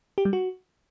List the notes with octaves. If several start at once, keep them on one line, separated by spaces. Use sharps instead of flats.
G4
G3
F#4